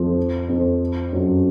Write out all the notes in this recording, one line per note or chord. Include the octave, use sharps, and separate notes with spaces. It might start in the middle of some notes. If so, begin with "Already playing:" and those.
Already playing: F2 F3
F2 F3
F#2 F#3